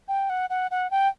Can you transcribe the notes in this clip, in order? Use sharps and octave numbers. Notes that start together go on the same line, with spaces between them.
G5
F#5
F#5
F#5
G5